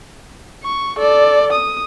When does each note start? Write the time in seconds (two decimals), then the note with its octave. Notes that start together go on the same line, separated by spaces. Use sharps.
0.63 C#6
0.98 A4 D5
1.52 D#6